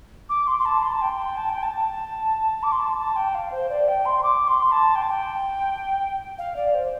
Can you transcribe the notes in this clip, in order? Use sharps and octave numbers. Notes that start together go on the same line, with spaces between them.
D6
C6
C6
A5
C6
A5
G5
A5
G5
A5
D6
C6
A5
A5
G5
F5
C5
D5
G5
C6
D6
C6
A5
G5
A5
G5
F5
D5
C5